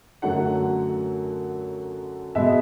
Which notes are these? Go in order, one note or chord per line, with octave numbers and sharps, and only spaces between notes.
F#2 D3 F#3 A3 F#5
B2 G#3 B3 E5